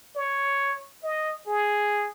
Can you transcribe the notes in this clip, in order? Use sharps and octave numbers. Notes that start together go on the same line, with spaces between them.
C#5
D#5
G#4